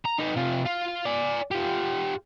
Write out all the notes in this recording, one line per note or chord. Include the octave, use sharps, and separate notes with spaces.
A#5
D#4 B4
C3 F4
F4
D5 G#5
F4 G4